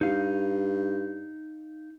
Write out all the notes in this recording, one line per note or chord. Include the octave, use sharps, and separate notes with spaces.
G2 D#4 F5